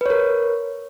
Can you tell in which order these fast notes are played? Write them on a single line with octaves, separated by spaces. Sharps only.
B4 C#5 A#4